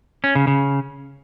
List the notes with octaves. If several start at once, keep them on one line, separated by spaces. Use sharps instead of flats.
C#4
C#3
C#3